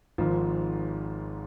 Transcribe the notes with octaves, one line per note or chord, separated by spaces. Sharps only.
G#1 G#2 D#3 F3